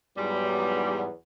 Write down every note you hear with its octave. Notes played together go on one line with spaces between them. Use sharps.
E2 G#2 F#3 G3 B3